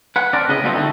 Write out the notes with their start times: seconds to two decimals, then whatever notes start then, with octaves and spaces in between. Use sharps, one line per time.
0.16 B4 F#5
0.33 C4 D4 A#4 D5
0.48 A2 C#3 B4 D#5
0.64 A#2 G3 A3 B3 C4 D#4
0.76 D3 D#3 A3 D#4